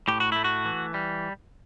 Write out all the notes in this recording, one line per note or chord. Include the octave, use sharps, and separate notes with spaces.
A2 G4
F#4
A3 E4
F#4
E3
G3